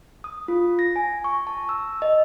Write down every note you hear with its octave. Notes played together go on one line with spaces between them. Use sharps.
D#6
F4
A#6
G#5
C#6
A5
E6
D#5